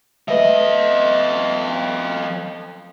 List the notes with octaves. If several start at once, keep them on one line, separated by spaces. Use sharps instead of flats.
F3 A3 B4 D#5 E5